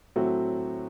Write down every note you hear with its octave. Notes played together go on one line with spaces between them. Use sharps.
A2 F#3 A3 C4 F#4